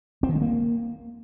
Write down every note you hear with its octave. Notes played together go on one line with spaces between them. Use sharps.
C4
D#3
G#3
A#3